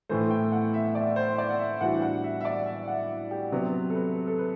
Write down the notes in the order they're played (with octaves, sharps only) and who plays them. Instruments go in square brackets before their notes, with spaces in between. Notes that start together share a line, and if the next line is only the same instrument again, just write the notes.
[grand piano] A2 E3 A3 [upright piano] C5
[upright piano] G5
F#5
E5
D5
C5
D5
F#5
E5
[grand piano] A2 E3 G3 D4 F#4 [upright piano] F#5
[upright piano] F#5
E5
E5
D5
E5
F#5
G4
[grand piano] C3 F#3 B3
[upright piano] A4
B4
A4
B4